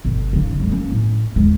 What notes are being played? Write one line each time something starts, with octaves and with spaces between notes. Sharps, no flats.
G1 B2
D#2 C#3
G1 G#3
A#3 C#4
A2
D#2 G#3